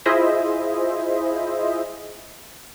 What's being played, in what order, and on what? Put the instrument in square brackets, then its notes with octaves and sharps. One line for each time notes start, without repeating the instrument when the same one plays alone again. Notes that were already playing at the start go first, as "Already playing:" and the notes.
[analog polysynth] E4 F4 G#4 C5 D#5 E5